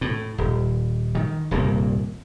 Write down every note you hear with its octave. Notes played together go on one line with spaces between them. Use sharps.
A2
D#1
D#3
D#1 C2 G2 A#3